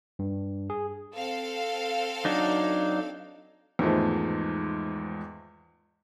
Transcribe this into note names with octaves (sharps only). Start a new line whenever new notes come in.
G2
G#4
C4 A4 F5
F#3 D4 D#4
E2 G#2 D#3 F3 G#3 A3